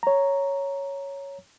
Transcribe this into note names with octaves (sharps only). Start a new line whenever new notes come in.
C#5 A#5